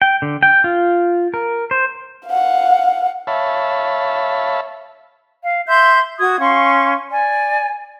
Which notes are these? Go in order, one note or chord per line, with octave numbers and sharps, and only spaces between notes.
G5
D3
G5
F4
A#4
C5
F5 F#5
C#5 E5 F5 A5 B5
F5
E5 C6 G6
F#4 D#6 G#6
C#4 F5 C6 C#6
D5 G#5